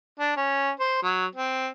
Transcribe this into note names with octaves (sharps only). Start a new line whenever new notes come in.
D4
C#4
C5
F#3
C4